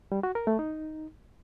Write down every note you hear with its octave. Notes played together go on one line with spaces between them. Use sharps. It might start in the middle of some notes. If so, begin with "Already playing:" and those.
G3
F#4
A#4
A3
D#4